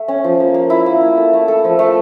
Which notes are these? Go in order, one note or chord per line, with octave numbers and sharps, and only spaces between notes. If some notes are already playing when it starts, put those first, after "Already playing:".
Already playing: A3
C#4
F3
A#3
A#3
E4
A#3
E4
A4
A3
A4
F3
A3